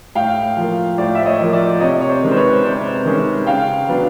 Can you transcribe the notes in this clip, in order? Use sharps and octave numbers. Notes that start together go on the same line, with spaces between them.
A2 F5 G5
F3 A#3
A2 C5 D5
E5
C#5 D#5
F3 A#3
D5 E5
C3 C#5 D#5
C#5
C5 D5
D#3 G#3 C#4
C5
B4 C#5
C3 C5 D5
D#3 G#3 C#4
C#3 F5 G5
F#3 B3 D4